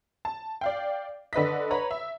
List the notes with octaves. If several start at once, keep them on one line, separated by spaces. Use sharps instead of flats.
A5
D5 F5 G5
D3 B4 D#5 B6
B4 C#5 A#5 B5
E5